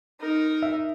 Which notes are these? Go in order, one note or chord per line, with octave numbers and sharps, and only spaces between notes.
D#4 A#4
E5